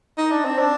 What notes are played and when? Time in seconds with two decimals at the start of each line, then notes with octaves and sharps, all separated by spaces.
0.17 D#4
0.31 D4
0.45 C4
0.59 D4